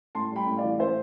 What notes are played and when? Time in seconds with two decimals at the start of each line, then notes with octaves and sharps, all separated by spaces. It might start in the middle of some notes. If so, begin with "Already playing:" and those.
0.15 A2 A5 C6
0.32 G3 G5 B5
0.47 A2
0.57 D5 F5
0.64 E3
0.79 A2 C5 E5